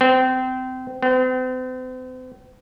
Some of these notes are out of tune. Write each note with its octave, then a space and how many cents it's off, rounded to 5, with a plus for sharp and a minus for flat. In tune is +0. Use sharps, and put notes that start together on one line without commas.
C4 -25
C4 -40